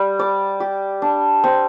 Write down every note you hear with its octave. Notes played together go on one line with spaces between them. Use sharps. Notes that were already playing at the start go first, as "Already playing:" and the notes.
Already playing: G3
D5
G4
D4
C4